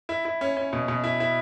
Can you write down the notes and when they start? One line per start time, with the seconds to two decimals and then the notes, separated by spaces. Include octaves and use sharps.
0.09 E4
0.25 E4
0.41 C#4
0.57 C#4
0.73 B2
0.88 B2
1.04 E4
1.20 E4